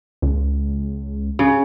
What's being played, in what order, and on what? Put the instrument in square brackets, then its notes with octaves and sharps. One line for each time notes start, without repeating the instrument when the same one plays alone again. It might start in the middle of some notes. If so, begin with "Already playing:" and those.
[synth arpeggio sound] C#2
[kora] C#3